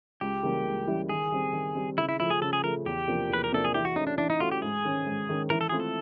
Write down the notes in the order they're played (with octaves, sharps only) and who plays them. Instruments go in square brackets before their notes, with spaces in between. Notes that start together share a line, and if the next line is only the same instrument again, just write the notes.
[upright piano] C#2 [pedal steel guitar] G4
[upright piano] C#3 E3 G3 A#3
C#2
C#3 E3 G3 A#3
[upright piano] D#3 [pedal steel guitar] G#4
[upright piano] G3 C4
D#3
G3 C4
[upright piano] C#3 [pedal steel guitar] E4
[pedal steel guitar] E4
[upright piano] F3 A3 [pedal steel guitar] E4
[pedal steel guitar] G#4
[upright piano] C#3 [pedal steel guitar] A4
[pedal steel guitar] G#4
[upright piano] F3 A3 [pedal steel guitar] A#4
[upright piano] E2 [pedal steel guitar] G4
[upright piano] C3 F3 A#3 D4
[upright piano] E2 [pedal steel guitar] B4
[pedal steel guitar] A#4
[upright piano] C3 F3 A#3 D4 [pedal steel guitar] A4
[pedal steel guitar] G#4
[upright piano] E3 [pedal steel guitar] G4
[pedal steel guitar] F#4
[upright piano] A3 C#4 F#4 [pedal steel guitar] D#4
[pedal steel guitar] D4
[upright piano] E3 [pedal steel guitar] D4
[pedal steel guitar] D#4
[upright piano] A3 C#4 F#4 [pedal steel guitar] F4
[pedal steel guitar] G4
[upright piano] G#2 [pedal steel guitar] G#4
[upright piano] D#3 G#3 C#4
G#2
D#3 G#3 C#4
[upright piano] E3 [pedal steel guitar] A#4
[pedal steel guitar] A4
[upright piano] A3 C4 F4 [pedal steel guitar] G#4
[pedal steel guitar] A4